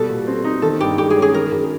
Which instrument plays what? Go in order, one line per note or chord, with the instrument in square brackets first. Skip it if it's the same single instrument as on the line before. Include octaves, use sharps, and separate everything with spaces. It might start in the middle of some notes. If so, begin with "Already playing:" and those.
Already playing: [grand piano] B2 G3 [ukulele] A4
[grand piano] A#2
C4
D#4
[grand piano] D#3 [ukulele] A4
[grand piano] G2 [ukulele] G4
[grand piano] G#3 [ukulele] G4
[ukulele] G#4
[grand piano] C#4
[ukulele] G#4
[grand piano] D#3 [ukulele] A#4
[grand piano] F#2